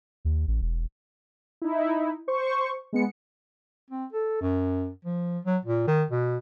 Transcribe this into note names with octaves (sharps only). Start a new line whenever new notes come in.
D#2
A1
E1
D#4 E4
C5 C#6
G#3 B3 C#7
C4
A4
F#2
F3
F#3
A#2
D#3
B2